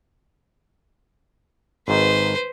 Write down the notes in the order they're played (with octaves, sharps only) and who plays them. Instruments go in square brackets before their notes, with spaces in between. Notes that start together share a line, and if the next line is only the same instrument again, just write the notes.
[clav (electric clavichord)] G#1 G#2 D#3 [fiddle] B4 C5